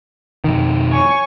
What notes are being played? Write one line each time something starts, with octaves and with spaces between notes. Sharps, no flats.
F2 B2 D#3
C#5 G#5 C#6